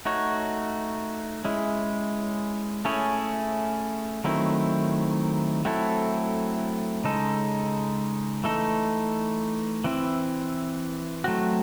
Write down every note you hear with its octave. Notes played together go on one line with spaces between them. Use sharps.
A3 D#4 F#4 C#5
G#3 C#4 E4
A3 C#4 E4 G#4 C#5
D#3 F#3 A3 C4 E4
F#3 A3 C4 E4 A4
C#3 G#3 D#4 A4
E3 A3 D#4 A4
E3 C4 E4
F#3 A3 C4 F#4